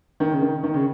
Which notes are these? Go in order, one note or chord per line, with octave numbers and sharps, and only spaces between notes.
D#3
C#3
D#3
D#3
C#3